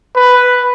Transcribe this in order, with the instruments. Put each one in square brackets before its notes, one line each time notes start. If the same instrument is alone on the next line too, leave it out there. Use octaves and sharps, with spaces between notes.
[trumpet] B4